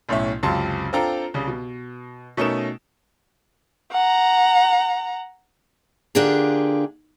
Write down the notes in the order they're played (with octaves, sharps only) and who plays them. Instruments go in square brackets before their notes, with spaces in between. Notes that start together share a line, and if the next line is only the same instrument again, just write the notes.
[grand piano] B1 A2 C#4 E5
C#2 F#2 C3 F4 A5 C6
C4 D4 F4 A4 G5 A#5
C2 C#3
B2
B2 A3 C#4 D#4 A#4 E7
[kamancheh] F#5 A#5
[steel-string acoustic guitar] D3 A#3 D4 F4 G4 G#4